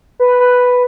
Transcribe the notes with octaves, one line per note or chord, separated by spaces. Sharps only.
B4
B4